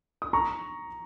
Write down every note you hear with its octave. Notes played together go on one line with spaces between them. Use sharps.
D#6
A#5 C#6